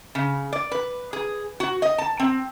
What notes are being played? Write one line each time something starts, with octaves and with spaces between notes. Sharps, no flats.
C#3
D5
B4
G#4
F#4
D#5
A5
C4